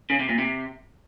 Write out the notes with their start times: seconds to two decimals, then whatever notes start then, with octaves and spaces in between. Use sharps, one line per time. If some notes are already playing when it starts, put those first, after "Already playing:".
0.10 C#3
0.19 C3
0.29 A#2
0.38 C3